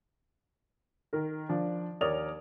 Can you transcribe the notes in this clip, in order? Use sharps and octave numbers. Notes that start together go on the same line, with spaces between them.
D#3 A#4
F3 D4 D5
D#2 A#4 C#5 D5 D#6 F7